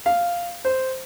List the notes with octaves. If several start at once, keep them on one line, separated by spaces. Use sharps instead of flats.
F5
C5